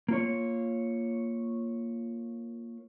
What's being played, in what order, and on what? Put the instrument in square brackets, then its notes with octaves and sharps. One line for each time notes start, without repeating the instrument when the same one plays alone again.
[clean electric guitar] A#3 F4 C#5